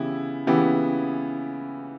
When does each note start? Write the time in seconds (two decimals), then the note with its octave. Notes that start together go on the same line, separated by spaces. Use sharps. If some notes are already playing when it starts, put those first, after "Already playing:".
Already playing: C#3 E3 B3 E4 G4
0.47 C#3 E3 B3 E4 G4